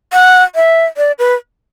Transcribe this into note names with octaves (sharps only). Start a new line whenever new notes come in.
F#5
E5
D5
B4